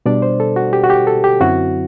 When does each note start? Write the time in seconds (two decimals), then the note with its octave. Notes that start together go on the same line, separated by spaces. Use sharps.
0.06 B2 G3 D4 D5
0.22 C5
0.40 A4
0.56 F#4
0.73 G4
0.84 F#4
0.90 G4
1.07 A4
1.24 G4
1.40 F#2 D3 F#3 C4 E4 F#4